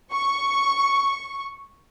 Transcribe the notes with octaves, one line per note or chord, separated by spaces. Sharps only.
C#6